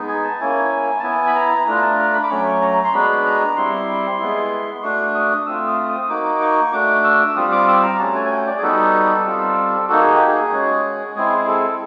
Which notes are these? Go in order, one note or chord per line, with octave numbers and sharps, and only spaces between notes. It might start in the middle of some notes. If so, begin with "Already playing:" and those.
Already playing: G#3 B3 D#4
G#5
A5
A#3 C#4 E4 G#5
A5
B3 E4 G#5
B5
A#5
A3 D4 F4 A#5
A5
A#5
B5
D6
F#3 A3 C#4 C#6
A#5
C6
G#3 B3 D4 F#4 B5
A#5
G3 C4 E4 C6
G#3 B3 E4
C6
A3 D4 F#4 C#6
D#6
A3 C4 F4 E6
D#6
D#6
A#3 D#4 F#4 D6
C#6
A3 D4 F#4 D6
E6
G3 C4 F4 D#6
D6
E6
A#5
A3 C#4 F#4 A5
G#5
G#5
G5
D5
G#4
G3 B3 D#4 F#4 A4
G3 C4 F4
A#3 D#4 F#4 A4
G#4
G4
G#4
G#3 C#4 F#4
G#3 C4 E4 G#4
G#4
A4